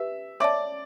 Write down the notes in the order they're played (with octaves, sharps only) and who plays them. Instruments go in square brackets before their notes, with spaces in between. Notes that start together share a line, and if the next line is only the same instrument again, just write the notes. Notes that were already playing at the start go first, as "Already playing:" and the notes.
Already playing: [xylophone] G4 B4 [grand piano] E5
[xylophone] C#5 E5 A5 [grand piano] D5 D6